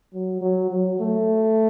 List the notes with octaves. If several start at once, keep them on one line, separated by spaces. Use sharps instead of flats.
F#3
F#3
F#3
A3